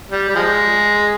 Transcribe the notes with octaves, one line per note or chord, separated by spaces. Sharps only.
G3
G3
F3 G#3